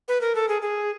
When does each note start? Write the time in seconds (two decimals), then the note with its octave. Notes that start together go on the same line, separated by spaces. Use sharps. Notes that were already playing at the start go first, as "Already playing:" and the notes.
0.08 B4
0.21 A#4
0.35 A4
0.49 G#4
0.62 G#4